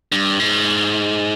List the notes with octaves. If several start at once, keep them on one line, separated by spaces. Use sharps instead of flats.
G2
G#2